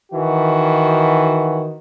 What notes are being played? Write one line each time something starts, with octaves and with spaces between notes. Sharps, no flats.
D#3 E3 F#4